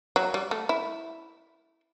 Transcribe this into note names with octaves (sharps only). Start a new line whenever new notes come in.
F#3
G3
A3
E4